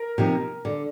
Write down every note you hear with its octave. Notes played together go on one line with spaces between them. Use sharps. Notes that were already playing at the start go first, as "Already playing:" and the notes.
Already playing: A#4
C3 F3 A#3 D#4
D3